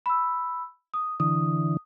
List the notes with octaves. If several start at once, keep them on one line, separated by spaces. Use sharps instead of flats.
B5 E6
D#6
D3 E3 D#6